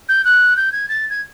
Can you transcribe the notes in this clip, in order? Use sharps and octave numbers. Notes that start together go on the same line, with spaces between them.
G6
F#6
G6
G#6
A6
G#6